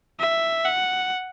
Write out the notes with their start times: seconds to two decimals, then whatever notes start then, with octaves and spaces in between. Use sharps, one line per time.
0.20 E5
0.65 F#5